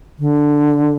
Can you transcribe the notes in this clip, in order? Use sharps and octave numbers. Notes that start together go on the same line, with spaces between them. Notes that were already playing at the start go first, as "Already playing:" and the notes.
D3